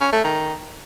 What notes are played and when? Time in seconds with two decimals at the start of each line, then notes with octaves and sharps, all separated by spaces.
0.01 C#4
0.13 A3
0.24 D#3